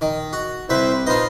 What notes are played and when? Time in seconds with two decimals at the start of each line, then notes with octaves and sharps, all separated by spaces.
0.01 D#3
0.33 F#4
0.70 C2 E4 B4 C5 E5
1.07 D#4 F4 B4 C5 D#5